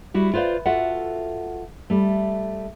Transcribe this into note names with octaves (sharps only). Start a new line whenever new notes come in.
G3 E4 F#4
F4 B4 C5 D5 F5
F4 F#4 A4 E5 F#5
G3 A3